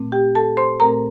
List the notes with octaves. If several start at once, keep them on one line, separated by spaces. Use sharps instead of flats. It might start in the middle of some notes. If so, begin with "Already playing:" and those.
Already playing: A#2 A3 C4
G4 G5
A4 A5
C5 C6
A#2 A3 C4 A#4 A#5